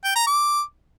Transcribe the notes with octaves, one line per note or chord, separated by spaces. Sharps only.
G5
A#5
D6